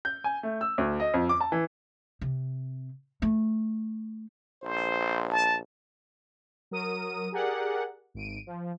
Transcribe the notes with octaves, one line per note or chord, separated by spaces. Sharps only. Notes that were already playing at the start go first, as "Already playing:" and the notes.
G6
G#5
A3
E6
D2
D#5
F2
D6
A5
E3
C3
A3
A#1 C5
A5
F#3 A#4 D#6 D#7
G4 G#4 A#4 D5 F#5
G#1 D7 D#7
F3